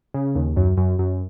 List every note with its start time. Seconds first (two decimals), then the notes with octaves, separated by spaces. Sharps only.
0.14 C#3
0.35 D#2
0.56 F#2
0.77 F#2
0.99 F#2